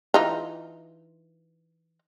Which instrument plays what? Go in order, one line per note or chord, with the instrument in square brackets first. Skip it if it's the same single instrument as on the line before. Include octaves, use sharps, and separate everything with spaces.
[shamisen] E3 D#4 F4